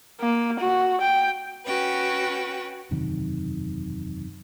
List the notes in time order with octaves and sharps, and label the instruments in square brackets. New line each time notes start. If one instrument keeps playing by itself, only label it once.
[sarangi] A#3
F#4
G5
[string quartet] C#4 F#4 B4 G5
[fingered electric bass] E1 F#2 C3 D#3